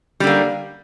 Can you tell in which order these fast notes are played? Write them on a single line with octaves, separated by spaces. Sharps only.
G3 D3 A#3